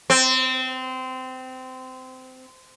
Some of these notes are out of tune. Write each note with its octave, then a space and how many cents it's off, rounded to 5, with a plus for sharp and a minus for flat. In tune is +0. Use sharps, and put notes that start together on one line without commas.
C4 -20